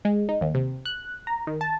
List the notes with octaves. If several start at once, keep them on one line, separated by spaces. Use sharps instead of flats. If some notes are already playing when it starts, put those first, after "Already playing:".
G#3
D#4
D#2
C3
F#6
A#5
D#3
A5